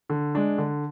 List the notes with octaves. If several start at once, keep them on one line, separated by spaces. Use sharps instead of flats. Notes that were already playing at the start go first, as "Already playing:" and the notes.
D3
G#3 D4
D3